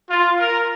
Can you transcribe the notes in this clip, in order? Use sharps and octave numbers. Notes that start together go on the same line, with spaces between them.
F4
A#4